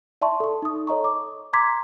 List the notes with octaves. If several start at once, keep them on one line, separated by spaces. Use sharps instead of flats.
D5 E5 A5 C6 C#6
A4 C#6
D#4 D#6
A4 C#5 D#5 A#5 C#6
D6
A#5 C6 D6 G#6 B6